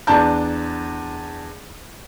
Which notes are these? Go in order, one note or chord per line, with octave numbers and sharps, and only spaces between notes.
E2 D4 A5 G6